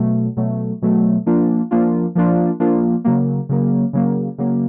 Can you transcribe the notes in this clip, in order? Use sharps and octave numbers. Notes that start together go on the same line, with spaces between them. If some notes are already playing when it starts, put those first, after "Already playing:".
Already playing: B2 F#3 A3
B2 F#3 A3
B2 F#3 A3
F3 A#3 D4 F4
F3 A#3 D4 F4
F3 A#3 D4 F4
F3 A#3 D4 F4
C#3 F#3 A#3
C#3 F#3 A#3
C#3 F#3 A#3
C#3 F#3 A#3